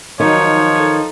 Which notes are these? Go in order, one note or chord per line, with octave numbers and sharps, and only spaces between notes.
D#3 F3 F#3 D#4 C#5
D#4 A4